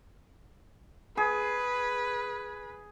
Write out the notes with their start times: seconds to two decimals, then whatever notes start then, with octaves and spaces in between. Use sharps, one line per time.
1.17 G#4 B4